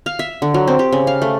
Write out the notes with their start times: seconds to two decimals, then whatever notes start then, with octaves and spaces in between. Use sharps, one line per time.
0.06 F5
0.19 E5
0.42 D3
0.54 F#3
0.67 C4
0.79 G4
0.92 C#3
1.07 F5
1.22 A3